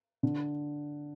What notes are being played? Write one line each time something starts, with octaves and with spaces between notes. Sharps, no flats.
D3